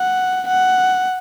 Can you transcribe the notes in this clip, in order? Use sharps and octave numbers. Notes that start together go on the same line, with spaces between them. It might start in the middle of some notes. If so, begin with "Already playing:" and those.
Already playing: F#5
F#5